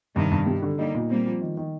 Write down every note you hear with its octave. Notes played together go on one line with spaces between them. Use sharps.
G2 C3 D#3
G2
G3
D3
G3 A#3 D#4
A#2
G3 A#3 C4
F3
D#3
D#3